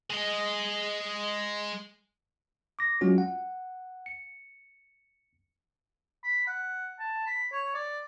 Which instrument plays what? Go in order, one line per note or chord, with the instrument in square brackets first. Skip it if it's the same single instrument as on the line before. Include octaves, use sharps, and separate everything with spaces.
[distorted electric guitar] G#3 D#5
[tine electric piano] D6 A#6
F#3 G#3 C#4 F4 F#4
F#5
C#7
[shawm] B5
F#5
A5
B5
C#5
D5